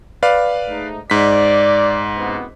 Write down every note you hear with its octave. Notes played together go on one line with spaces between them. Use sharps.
B4 D5 F5
G#2 A3 D#4
G#2 D5 B6
F#1 C3 B3